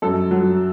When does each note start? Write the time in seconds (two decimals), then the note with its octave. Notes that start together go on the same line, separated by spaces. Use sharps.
0.02 F#2 A4
0.31 F#3